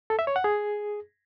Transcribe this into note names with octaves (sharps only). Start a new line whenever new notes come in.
A4
E5
C#5
F#5
G#4